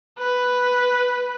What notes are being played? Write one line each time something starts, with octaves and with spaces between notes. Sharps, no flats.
B4